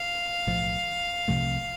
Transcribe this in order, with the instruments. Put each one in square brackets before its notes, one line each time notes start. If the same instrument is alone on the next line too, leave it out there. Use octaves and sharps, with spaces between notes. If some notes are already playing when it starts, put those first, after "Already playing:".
Already playing: [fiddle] F5
[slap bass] B1 A2 F3
C2 C3 F3 A3